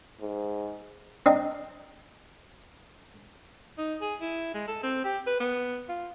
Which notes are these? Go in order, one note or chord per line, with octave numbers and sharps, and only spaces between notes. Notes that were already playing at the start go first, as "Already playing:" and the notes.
G#2
C4 D4 D#4
D#4
G#4
E4
G#3
A4
C4
G4
B4
B3
F4